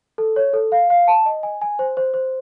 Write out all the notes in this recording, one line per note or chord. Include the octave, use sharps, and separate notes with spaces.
A4
C#5
A4
F5
F5
A5
D#5
G#5
G#5
C5
C5
C5